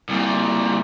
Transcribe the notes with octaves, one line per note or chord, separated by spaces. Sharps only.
C2 A#2